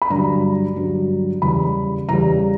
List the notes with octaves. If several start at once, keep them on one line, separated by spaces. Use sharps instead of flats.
B5
G2 D3 F#3 A#5
G2 D3 F#3
E2 C#3 G3 B5
E2 C#3 G3 A#5